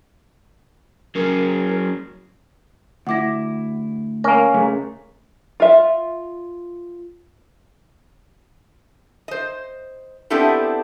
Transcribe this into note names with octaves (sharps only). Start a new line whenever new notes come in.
F#3 C#4 G#4 A#4
D2 E4 F#5 D6 A#6
A#3 C#4 A#4
C#3 G#3 A3
F4 E5
C5 D#5
B3 C4 D4 E4 G4 A4